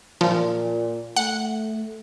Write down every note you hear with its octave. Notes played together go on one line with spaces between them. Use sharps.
A#2 F3
A3 F#5